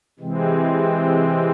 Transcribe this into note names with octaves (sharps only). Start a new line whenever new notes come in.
C3 E3 G#3 C4